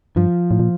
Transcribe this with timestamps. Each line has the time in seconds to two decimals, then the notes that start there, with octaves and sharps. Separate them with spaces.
0.16 G2 F3
0.51 A2
0.60 A#2